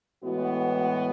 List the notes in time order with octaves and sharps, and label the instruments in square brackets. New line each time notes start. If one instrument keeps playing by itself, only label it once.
[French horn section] A2 E3 G#3 B3 F#4